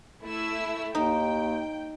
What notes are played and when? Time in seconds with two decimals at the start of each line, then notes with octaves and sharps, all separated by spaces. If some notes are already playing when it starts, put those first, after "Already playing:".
0.24 A3 E4 E6
0.95 D#2 D#4 G5